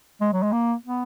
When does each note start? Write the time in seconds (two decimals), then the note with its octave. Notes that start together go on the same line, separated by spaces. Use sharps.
0.21 G#3
0.33 F#3
0.43 G#3
0.52 A#3
0.85 B3